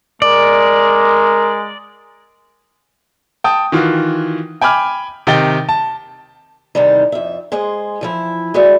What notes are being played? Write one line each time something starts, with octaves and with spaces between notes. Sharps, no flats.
G#3 A#4 D5
G5 A5 D#6
D#3 E3 F4 F#4
G5 G#5 B5 D6 F6
C3 D#3 D#4 G5 A6 G7
A5
E2 C3 D#3 G3 D#4
F2 E5
G#3 G#4 C5 D#5
E3 F3 E4
G#3 F#4 B4 D5 E5